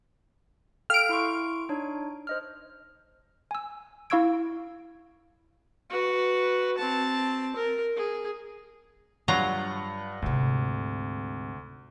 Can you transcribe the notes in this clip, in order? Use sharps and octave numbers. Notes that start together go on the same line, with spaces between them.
A4 F5 G5 F6 D7
E4 C6 C#6
D4 D#4 C#5
C5 D#5 F6
G#5 E6
E4 F5 C#6 E6 G#6 D7
F#4 B4
C4 A5
A#4
G#4
G2 F#3 F4 F#5 A#5
D2 G#2 C3